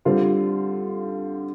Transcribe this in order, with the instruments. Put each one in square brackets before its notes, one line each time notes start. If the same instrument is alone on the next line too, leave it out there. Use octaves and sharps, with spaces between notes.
[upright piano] D3 G3 C4 F4